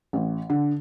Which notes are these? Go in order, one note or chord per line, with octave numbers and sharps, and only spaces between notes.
A1
D3